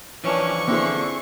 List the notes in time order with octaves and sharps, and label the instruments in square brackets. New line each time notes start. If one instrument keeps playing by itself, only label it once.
[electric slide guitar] E3 F3 D4 [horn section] C#4 [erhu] C#6
[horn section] D3 [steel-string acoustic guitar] C4 E4 G#4